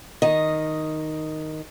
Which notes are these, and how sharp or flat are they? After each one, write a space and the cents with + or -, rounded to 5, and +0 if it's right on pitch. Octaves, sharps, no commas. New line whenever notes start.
D#3 +0 D#5 +0